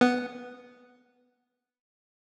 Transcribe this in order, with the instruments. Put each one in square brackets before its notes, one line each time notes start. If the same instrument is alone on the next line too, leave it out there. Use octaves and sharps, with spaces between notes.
[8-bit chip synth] B3 F#5